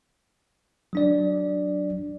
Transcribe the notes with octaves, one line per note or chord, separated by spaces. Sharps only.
F#3 D4 D5